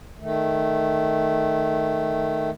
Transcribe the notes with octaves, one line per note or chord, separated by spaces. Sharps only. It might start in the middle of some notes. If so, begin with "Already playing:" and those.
D#3 A3